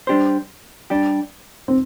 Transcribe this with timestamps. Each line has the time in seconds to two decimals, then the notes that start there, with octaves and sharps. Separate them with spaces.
0.07 G3 D4 G4 C5
0.90 G3 D4 G4
1.68 C4